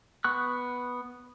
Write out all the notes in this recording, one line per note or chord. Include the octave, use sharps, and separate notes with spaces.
B3 C#6 F#6